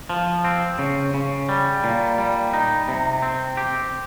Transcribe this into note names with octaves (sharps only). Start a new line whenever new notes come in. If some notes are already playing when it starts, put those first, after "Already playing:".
F3
C4
C#3
C#3
G3
A#2
G3
D#4
C3
C4
G4